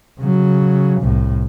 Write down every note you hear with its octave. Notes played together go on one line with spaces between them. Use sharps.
C#3 F#3
C2 A2